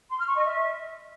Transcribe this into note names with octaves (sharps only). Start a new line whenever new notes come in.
C6
F6
C#6
D#5
E5